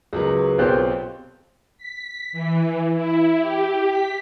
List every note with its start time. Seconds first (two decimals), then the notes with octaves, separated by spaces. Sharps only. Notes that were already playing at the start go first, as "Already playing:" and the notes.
0.13 C#2 F#3 F#4 G#4 A#4 B4
0.58 B1 C4 F4 G4 C5 F#6
1.78 B6
2.33 E3
2.93 E4
3.39 G4
3.89 B6